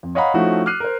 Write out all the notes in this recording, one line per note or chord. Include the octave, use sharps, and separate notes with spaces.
F2
C#5 D#5 F5 F#5 A#5 B5
F3 A3 C#4 D#4 E4 F#4
D6 F6 F#6 C7 D#7
A#4 C5